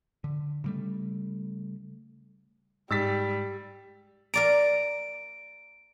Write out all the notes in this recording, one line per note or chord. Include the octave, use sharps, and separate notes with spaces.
D3
C#3 G3 A3
G#2 G3 E6 A6 B6
A#4 D5 A#5 D7